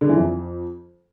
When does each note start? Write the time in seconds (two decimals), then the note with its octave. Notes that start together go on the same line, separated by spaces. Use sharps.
0.01 D3
0.09 E3
0.17 F2